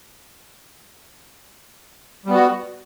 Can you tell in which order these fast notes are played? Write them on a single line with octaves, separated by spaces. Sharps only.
G3 B3 F#4